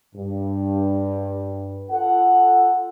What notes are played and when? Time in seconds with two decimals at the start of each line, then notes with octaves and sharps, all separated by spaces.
0.15 G2
1.90 F4 A4 F#5